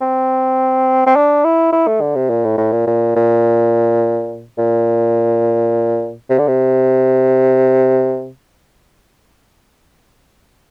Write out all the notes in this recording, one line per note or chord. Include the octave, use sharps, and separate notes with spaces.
C4
C4
D4
E4
E4
A3
D3
C3
A#2
A2
A2
A#2
A#2
A#2
A#2
C3
D3
C3